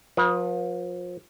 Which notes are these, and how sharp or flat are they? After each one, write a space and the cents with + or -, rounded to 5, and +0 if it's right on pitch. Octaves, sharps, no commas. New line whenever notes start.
F3 +35 B4 -35